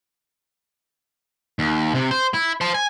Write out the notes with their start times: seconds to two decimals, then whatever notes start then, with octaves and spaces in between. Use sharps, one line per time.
1.59 D#2
1.95 C3
2.11 C5
2.34 E4
2.61 C5 A5
2.74 G#5